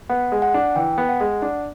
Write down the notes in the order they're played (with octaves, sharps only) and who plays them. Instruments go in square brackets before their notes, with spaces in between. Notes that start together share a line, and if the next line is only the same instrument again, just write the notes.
[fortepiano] B3 [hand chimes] F#5
[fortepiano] G#3
[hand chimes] F#5
[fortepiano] D4
[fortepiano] E3 [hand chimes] G5
[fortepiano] B3
[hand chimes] F#5
[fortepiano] G#3
D4